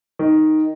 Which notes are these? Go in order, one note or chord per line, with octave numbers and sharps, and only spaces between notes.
D#3